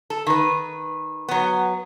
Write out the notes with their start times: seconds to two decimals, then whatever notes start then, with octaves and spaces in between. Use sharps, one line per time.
0.10 A4
0.27 D#3 B4
1.29 F#3 B3